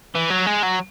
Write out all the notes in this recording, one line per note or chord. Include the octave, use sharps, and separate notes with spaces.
E3
F#3
G#3
F#3